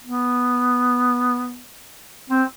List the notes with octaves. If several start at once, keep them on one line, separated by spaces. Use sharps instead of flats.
B3
C4